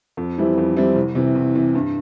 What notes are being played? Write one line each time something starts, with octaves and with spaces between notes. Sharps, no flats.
F2
E3 G3 C4 E4
F2
E3 G3 C4 E4
C2
C3 E3
C2
C3 E3
G2